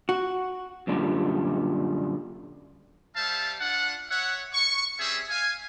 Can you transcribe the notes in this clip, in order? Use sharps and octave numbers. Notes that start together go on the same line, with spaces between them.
F#4
F#2 A#2 D3 G3
G3 C5 E5 F5 A5
D4 F4 F#5
C#5 E5 F#5
C#6
G3 C4 C#4 G#4 E5
F5 G#5